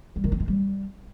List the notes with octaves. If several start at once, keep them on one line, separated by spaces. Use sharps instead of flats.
G3
D#3
C4
G#3
G3